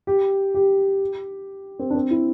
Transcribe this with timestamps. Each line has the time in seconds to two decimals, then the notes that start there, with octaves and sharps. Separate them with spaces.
0.07 G4
0.54 G4
1.79 C4
1.90 D4
1.95 C4
2.11 E4